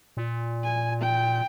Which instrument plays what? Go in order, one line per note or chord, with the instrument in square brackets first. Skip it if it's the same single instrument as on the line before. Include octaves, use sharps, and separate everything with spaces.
[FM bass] A#2
[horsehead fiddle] G#5
G5